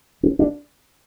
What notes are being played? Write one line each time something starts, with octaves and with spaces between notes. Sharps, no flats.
C#4
D4